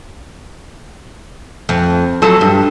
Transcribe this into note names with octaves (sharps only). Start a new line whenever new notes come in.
F2
F#3 F4 A4
G2